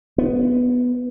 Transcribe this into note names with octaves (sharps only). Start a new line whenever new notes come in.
B3